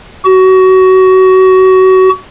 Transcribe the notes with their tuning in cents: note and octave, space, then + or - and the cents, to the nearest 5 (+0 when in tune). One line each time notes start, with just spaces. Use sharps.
F#4 +25